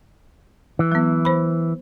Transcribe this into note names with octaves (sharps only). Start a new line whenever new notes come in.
E3
F#3 B3
C5 B5